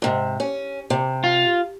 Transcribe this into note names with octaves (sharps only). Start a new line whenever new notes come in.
G#2 C3
C#4
C3
F4